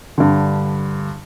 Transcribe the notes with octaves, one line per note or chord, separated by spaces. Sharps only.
G2 D3